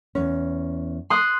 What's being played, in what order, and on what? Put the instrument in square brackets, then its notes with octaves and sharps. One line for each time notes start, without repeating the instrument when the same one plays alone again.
[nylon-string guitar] E2 C#4
[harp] C6 D#6 F#6